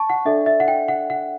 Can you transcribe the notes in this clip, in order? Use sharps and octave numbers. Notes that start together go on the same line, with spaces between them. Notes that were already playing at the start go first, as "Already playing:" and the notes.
Already playing: A5 C#6
F#5
D4 A4 D5 E5
E5
F#5
G5
F#5
F#5